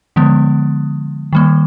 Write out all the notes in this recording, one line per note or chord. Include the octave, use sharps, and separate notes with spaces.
D3 F3 G#3 B3
D#3 G3 A#3